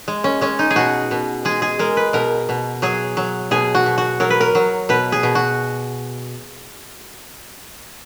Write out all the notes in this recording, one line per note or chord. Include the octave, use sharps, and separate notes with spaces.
G#3
C#4
G#3 C#4
D#4
G#4
B2 F#4
B2
G#3 G#4
G#4
G#3 A#4
B4
B2 A#4
B2
F#3 G#4
F#3
B2 G#4
F#4
B2
F#4
F#3 A#4
B4
A#4
F#3
B2 B4
G#4
B2
F#4